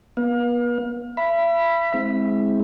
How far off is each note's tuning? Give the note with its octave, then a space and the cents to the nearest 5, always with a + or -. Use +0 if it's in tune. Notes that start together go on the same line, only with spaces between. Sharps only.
B3 -40 F5 +35
E5 +40 B5 +0
G#3 +0 C4 +0 E4 -20